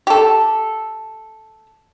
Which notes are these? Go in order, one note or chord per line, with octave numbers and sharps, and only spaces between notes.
G4 A4